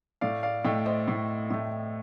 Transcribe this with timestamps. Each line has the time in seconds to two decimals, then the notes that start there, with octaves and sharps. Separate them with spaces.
0.21 A2 A3 D5 F5
0.43 D5 F5
0.65 A2 A3 D#5 G5
0.86 C5 D#5
1.08 A2 A3
1.50 A2 A3